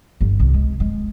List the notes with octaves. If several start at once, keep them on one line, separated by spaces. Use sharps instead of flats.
G1
C2
G#3
G#3